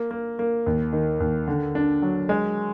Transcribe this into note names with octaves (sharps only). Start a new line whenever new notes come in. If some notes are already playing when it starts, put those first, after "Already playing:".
Already playing: A#3
A#3
A#3
D#2
D#3
D#2
D3
D4
F#3
G#3